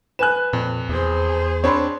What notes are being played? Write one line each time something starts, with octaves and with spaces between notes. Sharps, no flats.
B4 G#5 F#6 E7
F2 A#2
E2 G#4 C5
C4 D4 C#5 B5 C6